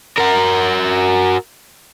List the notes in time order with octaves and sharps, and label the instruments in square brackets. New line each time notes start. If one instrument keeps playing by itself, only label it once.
[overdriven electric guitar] F#4 A#4